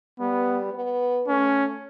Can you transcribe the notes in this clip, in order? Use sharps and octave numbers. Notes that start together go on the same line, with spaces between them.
G3 B3
B3
A3 C#4